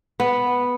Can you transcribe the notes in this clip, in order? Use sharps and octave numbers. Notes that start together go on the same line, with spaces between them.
B3